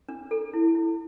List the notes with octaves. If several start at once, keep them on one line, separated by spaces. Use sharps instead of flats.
D4
A4
E4
E4